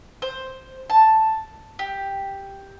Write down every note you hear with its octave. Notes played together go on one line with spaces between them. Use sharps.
C5
A5
G4